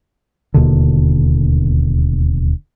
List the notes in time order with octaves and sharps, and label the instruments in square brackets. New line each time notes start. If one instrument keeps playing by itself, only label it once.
[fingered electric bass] D1 D#2 B2 D3